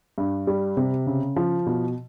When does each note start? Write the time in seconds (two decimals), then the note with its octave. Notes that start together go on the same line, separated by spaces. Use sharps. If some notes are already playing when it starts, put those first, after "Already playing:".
0.18 G2
0.47 G3
0.77 C3
1.07 C#3
1.36 F3
1.66 B2